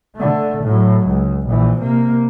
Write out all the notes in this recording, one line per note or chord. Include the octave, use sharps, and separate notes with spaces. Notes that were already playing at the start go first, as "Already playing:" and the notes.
D3 A3
A2 F#3
C#2
A#1 E3
C3 A#3